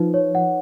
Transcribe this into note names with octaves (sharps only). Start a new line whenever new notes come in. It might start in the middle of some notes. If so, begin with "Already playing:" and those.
Already playing: F3 D#4 B4
C#5
F#5